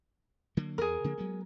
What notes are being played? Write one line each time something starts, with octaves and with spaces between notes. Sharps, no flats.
D3 F#3 A#3
E2 G#4 A#4
C#3 F3 A#3
F#3 G#3 B3